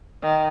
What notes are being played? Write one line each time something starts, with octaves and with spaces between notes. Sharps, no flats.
D#3